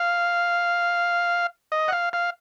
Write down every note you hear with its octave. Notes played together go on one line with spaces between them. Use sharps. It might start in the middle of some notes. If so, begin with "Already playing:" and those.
Already playing: F5
D#5
F#5
F5
F5